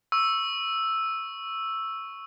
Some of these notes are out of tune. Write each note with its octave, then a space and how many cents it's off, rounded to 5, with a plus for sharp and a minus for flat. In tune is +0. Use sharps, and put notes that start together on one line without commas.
C#6 +0 E6 +0